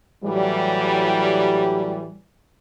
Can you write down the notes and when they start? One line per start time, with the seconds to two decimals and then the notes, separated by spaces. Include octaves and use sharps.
0.23 A2 E3 F#3 G3